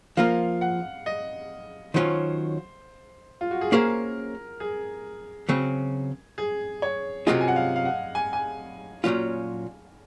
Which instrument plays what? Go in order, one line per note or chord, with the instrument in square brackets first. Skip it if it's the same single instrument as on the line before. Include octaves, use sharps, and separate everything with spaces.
[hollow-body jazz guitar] F3 A#3 F4 A#4 [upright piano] F5
[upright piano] F#5
D#5
[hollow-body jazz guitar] D#3 F#3 C#4 F4 [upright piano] C5
[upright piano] F4
F#4
G#4
[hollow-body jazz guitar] A#3 C#4 G#4 C5 F5 [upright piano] A#4
[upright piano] G#4
[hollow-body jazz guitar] C#3 F#3 C4
[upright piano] G#4
C#5
[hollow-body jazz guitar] C3 F#3 C#4 F4 G#4 [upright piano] D#5
[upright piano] G#5
F#5
F5
F5
F#5
G#5
G#5
[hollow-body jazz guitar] A#2 F#3 C#4 F4